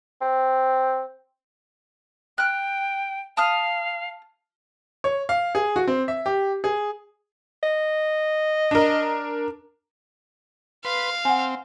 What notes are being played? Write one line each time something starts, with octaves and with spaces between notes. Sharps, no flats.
C4
G5 F6 F#6
F5 A5 D#6 F6
C#5
F5
G#4
F#4
C4
E5
G4
G#4
D#5
D4 A#4
B4 F5 C6
C4 F#5 G#5